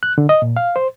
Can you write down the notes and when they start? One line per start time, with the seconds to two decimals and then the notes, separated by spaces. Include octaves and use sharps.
0.03 F#6
0.18 D3
0.29 D#5
0.42 A#2
0.56 F5
0.76 C5